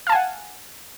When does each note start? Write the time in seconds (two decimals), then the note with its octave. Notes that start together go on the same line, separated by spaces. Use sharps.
0.07 F5
0.09 A5
0.12 G#5
0.15 F#5